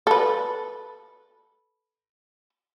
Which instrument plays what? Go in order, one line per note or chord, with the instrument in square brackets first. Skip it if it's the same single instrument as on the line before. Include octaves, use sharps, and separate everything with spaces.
[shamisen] A4 B4